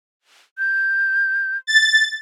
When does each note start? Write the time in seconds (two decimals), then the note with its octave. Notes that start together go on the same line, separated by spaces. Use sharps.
0.58 G6
1.67 A6